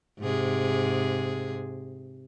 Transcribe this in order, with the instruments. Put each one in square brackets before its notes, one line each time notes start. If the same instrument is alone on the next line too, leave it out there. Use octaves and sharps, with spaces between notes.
[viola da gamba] G#2 C3 G#4